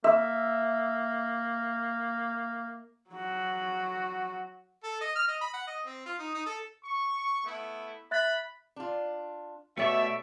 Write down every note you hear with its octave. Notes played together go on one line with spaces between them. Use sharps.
A#3 E5
F#3 F#4
A4
D#5
F6
D#5
B5
F#5
D#5
C4
F4
D#4
D#4
A4
C#6
A3 B3 E4
E5 B5 F#6 A6
D4 F4
B2 A3 G4 C#5 D5 E5 C#6